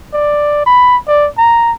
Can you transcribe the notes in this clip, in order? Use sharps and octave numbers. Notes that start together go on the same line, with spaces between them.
D5
B5
D5
A#5